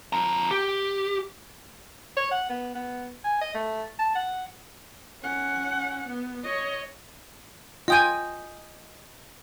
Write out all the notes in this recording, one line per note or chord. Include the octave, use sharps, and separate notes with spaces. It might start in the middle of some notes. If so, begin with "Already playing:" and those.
F2 A#5
G4
C#5
F#5
B3
B3
G#5
D#5
A3
A5
F#5
C#4 F#5
B3
C#5 D#5
F4 D#5 G5 G#5 D#6 G6